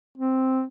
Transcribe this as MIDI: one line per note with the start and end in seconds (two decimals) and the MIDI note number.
0.18 0.63 60